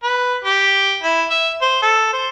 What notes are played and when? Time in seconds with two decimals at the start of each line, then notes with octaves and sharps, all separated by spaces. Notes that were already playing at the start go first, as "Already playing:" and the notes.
0.03 B4
0.44 G4
1.03 E4
1.30 E5
1.62 C5
1.82 A4
2.13 C5